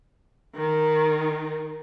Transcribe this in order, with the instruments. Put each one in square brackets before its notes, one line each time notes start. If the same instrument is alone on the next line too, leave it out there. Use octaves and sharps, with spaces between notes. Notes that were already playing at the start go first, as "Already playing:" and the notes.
[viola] D#3